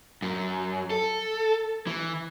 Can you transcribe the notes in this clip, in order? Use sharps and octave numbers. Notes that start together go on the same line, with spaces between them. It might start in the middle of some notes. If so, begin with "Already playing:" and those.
F#2
A4
E3